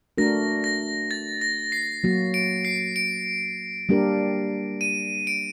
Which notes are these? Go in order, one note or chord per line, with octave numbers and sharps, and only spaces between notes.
A3 D4 F#4 A#4 A#6
A#6
A6
A#6
C7
F#3 A#3 F#4
D7
C7
D7
G3 A#3 D4 G4 A#4
D#7
D7